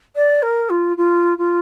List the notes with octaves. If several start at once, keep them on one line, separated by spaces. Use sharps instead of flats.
D5
A#4
F4
F4
F4